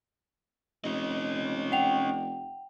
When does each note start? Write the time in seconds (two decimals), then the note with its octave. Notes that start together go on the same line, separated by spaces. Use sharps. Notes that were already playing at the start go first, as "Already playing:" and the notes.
0.84 F1 C#4 D#5
1.72 F#5 G5 F7